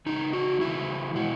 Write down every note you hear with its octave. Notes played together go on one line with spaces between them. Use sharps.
C#3 E3 G#3 D#4
F#4
C#3 E3 G#3 E4
B2 G#3 F#4